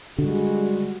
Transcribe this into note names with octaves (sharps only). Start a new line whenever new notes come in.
D3 G3 G#3 F#4